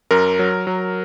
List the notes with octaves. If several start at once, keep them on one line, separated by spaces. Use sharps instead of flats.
F#2 A#4
F#3
F#3